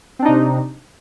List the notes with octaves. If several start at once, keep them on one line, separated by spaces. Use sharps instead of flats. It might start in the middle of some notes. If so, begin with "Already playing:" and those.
C3 C4 D4 D#4